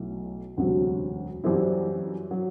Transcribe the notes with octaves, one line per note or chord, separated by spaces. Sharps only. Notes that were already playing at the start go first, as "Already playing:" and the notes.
Already playing: B1 B2 F#3 A3 E4
E1 D2 C3 F#3
F#2 E3 G3 C4 E4
F#3